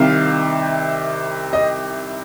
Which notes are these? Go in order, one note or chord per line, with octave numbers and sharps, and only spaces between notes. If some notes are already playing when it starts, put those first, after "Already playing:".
Already playing: C2 C3 D#3 F5
D#5